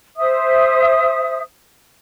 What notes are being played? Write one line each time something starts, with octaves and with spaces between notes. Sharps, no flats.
C5 E5 D#6